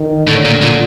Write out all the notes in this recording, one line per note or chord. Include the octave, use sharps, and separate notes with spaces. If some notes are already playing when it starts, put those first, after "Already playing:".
Already playing: D#3
A2 D3
A#2
A#2